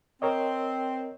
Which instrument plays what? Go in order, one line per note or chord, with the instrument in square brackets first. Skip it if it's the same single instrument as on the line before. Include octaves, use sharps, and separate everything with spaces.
[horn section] C4 [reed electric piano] A#4 C#5 D#5